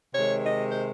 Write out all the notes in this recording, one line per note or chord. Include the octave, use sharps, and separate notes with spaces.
C3 D#3 G#3 C#5
D#5
C5